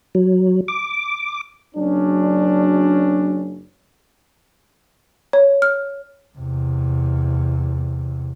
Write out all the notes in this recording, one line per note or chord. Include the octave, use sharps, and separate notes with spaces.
F#3
D6
F#1 F#3 C#4 D4
C#5
F6
E2 C3